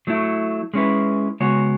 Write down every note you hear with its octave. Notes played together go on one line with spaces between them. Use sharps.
F#3 A3 E4
G#3 C#4 E4 B4
C#3 G#3 B3 F#4 C#5